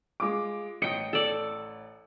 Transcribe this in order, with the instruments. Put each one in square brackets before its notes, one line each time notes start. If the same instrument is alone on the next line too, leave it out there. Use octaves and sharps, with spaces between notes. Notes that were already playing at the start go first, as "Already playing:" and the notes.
[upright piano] G#3 F4 D6
[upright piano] A1 C#7 [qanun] D#5 G5
[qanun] A4 D5